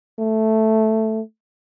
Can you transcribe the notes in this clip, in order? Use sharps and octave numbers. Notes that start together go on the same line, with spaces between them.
A3